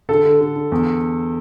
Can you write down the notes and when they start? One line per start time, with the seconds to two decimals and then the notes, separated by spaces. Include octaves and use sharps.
0.09 D3 A4
0.25 D3
0.41 D3
0.56 D3
0.72 E2